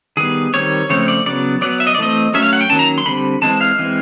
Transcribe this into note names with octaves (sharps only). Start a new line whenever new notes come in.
D#3 G3 B3 G#4
D#3 G3 C4 C#5
C#3 F3 A3 C4 C#5
D5
C#3 F#3 B3 D5
F#3 B3 D5
E5
D#5
D5
E3 A3 C4 D#5
F#3 A3 C#4 E5
F5
F#5
G5
D#3 F#3 A#3 C#4 A5
A#5
C6
D3 G3 C4 B5
E3 G#3 C4 A5
F5
E3 G#3 C4